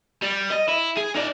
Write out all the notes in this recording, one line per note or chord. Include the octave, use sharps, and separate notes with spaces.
G3
D#5
E4
G#4
D#4 D5